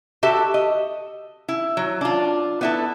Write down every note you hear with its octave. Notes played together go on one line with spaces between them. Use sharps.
F#4 G4 A4 E5
D#5
E4
F#3
D4 F4
B3 E4 A4